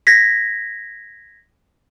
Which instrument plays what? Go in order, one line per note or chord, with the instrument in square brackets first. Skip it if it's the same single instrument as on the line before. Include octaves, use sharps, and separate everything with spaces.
[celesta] G#6 A#6 B6